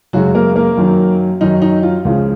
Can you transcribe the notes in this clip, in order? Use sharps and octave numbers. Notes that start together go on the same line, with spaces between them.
F#2 C#3 F#3 G#3 F#4
A#3 A#4
A#3 A#4
F#2 D#3 F#3
F#2 D#3 F#3 D#4
D#4
F4
C#2 C#3 F3